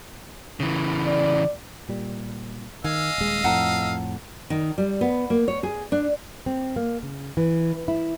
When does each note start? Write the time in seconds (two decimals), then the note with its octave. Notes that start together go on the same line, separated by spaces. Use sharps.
0.60 C#3 E3
1.06 D5
1.89 A#2 G3
2.84 D#3 D#5 F5 G#5 E6
3.18 D#1 G#3
3.44 F2 A2 F3 F#5 A5 A#5
4.50 D#3
4.78 G3
5.01 B3
5.30 A#3
5.48 C#5
5.63 G#4
5.92 D4
6.46 C4
6.76 A#3
7.03 C#3
7.37 E3
7.88 E4